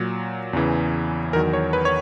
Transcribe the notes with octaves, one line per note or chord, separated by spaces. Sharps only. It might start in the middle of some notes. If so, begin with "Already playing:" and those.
Already playing: A#2 F#3
E2 C#3 E3
E2 D#3 F#3 A#4
C#5
B4
C#5